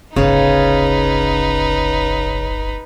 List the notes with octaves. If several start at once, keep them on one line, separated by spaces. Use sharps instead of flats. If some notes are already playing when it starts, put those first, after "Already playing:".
D1 G1 C#3 D#4 B4